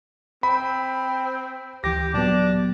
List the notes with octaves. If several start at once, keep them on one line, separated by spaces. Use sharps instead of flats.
C4 B5
D2 E3 G4 A#6
A#2 F#3 B3 D4